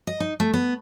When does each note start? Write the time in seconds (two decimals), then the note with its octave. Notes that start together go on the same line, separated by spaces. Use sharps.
0.07 D#5
0.20 D#4
0.40 A3
0.53 B3